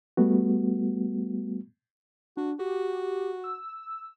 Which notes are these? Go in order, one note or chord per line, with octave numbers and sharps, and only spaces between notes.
G3 A3 B3 F#4
D4 F#4
F#4 G4
E6